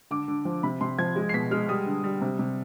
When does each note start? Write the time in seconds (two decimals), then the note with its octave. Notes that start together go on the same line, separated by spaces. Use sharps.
0.11 D3 D6
0.28 D3
0.45 F3
0.63 C3 B5
0.81 C3 C6
0.99 F3 G#6
1.16 G#3
1.29 C7
1.34 B2 B6
1.51 G#3 F6
1.69 G3 D#6
1.86 D3
2.04 G3
2.21 C3
2.39 C3